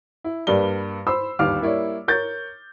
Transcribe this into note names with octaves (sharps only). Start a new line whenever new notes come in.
E4
G2 G3 A#3 B4 D5 G7
C5 B5 E6
G1 D#2 G3 F5 D6 F6
G3 A#3 E4 C#5 D5
A#4 C#5 G6 A6